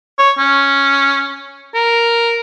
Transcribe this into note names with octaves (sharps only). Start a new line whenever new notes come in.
C#5
C#4
A#4